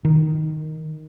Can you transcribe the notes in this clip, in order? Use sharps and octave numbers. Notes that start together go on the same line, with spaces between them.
D#3